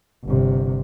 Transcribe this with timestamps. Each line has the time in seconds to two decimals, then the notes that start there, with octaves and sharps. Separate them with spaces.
0.25 G1 C3